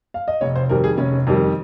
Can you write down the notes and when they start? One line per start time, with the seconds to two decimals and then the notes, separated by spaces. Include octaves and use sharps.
0.14 F5
0.28 D#5
0.41 F1 C#5
0.56 C5
0.69 F2 D#3 G3 A#4
0.84 G#4
0.98 F1 C#4
1.27 F2 D#3 G3